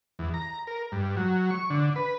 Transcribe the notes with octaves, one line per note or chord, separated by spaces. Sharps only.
E2
A#5
A#4
G2
F#3
C#6
D3
B4